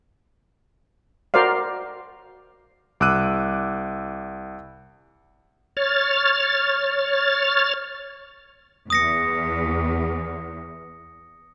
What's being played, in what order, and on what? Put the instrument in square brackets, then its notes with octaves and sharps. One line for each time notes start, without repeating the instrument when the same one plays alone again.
[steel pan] F#4 A#4 C5 D5 F5
[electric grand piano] C2 D6 E6 F#6 D#7
[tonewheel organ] C#5 F6 A6
[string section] E2 [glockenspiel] D#6 A#6 C#7